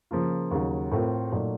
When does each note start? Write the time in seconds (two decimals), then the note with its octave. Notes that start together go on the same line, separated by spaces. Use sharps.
0.11 C#3 F3 A#3 F4
0.51 D#2 C#3 F#3
0.91 A2 A3 C4 F4 A#4
1.32 A#2 F#3 A3 D#4